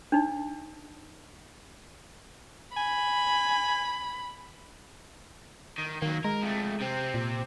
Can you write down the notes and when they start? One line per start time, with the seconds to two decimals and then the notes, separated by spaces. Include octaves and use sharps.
0.12 D4 D#4
2.77 G#5 B5
5.78 D#3
6.02 D#3 F#3 A#3
6.24 G#3 A#4
6.42 F2 A3
6.80 C3 C4
7.14 A#2